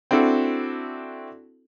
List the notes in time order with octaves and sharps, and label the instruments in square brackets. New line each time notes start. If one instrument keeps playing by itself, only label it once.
[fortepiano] C4 D4 E4 F#4 A4